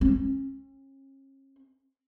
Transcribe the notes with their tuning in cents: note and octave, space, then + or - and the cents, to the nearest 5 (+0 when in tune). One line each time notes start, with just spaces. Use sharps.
C#4 -40